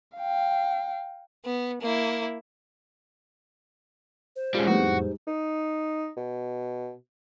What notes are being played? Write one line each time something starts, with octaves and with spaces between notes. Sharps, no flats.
F5 G5
B3
A#3 E4
C5
G3 G#3 C#4 F4
F2 A2 G3 G#3 B3 D#4 F#4
D#4
B2